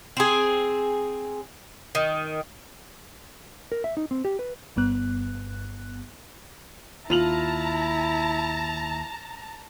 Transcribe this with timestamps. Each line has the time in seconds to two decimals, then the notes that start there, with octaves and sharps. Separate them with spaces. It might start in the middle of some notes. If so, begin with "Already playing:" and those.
0.17 C4 G#4
1.95 D#3
3.72 A#4
3.84 E5
3.97 D#4
4.11 C4
4.25 G4
4.39 B4
4.76 G1 G2 B3 F#6
7.10 D#2 E4 F4 A5 A#5 F7 F#7